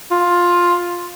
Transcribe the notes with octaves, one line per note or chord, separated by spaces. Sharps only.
F4